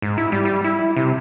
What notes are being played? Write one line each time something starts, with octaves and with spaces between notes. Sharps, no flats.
G#2
E4
G3
G3
E4
C3